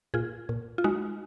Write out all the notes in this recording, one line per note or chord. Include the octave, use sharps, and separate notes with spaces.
A#2 F4 G#4
A#2
F4
G#3 D#4 F#4